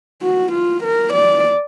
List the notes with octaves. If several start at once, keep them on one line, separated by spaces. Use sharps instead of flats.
F#4
F4
A#4
D5